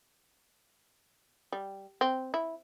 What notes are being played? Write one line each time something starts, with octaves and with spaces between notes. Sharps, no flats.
G3
C4
E4